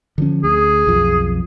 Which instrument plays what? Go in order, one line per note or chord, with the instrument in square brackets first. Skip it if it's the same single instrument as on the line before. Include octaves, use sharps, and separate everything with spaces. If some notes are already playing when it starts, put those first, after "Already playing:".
[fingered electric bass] D3 F3 C#4
[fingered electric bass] D2 [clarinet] G#4
[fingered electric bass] B1 F2 F3